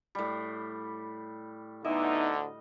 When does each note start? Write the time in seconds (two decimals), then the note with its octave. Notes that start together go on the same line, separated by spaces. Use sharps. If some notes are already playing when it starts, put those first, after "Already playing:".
0.15 A2 G3
1.85 D2 D3 B3 D#4 E4 D#5